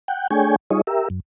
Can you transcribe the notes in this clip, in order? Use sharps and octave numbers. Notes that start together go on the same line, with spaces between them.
F#5 G5
A3 D4 G#4 C#5 G5 G#5
G3 D#4 F4 G#4 C#5 D#5
G4 A#4 E5
F#2